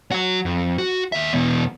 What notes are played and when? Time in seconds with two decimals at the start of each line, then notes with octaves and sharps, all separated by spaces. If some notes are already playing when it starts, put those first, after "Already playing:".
0.11 F#3 F#4
0.45 F2
0.78 F#4
1.12 D#2 E5
1.33 E2 B2